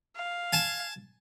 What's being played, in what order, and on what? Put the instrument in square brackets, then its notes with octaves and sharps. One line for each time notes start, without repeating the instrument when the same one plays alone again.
[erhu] F5
[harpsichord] G#5 A5